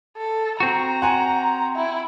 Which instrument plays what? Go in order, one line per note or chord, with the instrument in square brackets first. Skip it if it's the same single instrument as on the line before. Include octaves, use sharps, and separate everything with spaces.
[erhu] A4
[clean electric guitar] C4 F#4 [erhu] A#5
[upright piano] F#5 G#5 [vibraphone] C6
[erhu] E4 [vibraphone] E5